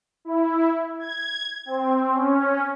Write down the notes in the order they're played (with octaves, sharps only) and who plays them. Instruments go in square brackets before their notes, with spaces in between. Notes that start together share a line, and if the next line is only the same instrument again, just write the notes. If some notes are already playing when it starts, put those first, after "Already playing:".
[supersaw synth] E4
G#6
C4
C#4